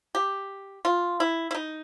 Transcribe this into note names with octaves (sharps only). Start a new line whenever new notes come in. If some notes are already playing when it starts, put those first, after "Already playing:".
G4
F4
E4
E4
D#4